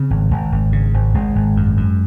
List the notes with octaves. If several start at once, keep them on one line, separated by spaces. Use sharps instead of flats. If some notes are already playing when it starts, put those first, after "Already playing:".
Already playing: C#3 C4
G#1
G#1
G#1
C#3
G#1
G#1 G#3
G#1
F#2
F#2